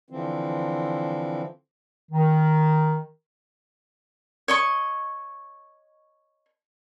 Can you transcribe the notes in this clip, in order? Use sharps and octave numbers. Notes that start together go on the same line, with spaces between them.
D3 E3 F3 C4
D#3
C#5 D#5 C#6